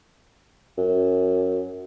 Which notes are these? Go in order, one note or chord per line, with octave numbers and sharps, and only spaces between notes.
F#2